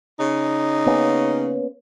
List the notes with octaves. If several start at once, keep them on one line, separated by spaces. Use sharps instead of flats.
C#3 D#4
A#3 B3 C#4